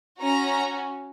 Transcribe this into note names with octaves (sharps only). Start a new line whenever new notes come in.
C#4 F#4 A#5